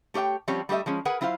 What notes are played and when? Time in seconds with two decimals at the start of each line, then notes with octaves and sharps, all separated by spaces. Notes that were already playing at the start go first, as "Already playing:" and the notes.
0.14 A3 G4 C#5 E5 G5
0.48 F3 G3 C4 C#4 G4 C#5
0.69 G3 A3 G4 D#5 E5
0.86 F3 G#3 C#4
1.05 G#4 A#4 B4 F#5 G#5
1.21 F#3 E4 F4 C5 F5